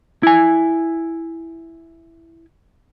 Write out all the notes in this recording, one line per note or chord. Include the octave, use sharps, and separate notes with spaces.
E4 G#5